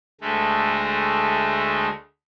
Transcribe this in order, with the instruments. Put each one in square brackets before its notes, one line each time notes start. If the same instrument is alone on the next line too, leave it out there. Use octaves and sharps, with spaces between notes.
[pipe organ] D2 G#3 A3